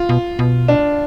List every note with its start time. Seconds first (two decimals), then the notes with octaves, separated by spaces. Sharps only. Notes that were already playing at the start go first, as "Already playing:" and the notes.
Already playing: F4
0.09 B2
0.39 B2
0.68 D4